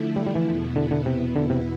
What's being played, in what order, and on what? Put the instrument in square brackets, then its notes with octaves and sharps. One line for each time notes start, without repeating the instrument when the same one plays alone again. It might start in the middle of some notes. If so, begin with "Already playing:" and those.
Already playing: [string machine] D3 F3 A3 E4
[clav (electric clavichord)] G3
G3
E3
[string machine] E2 B2 B3 E4
[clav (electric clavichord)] D3
D3
C3
D3
C3